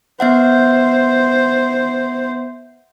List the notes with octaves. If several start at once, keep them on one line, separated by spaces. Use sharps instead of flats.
B3 C5 E5 F#5